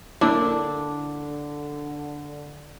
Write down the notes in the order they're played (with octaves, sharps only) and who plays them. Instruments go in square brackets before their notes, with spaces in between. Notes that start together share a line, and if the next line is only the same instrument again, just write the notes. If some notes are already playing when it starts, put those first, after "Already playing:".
[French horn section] D3 [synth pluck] A#3 E4 [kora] D4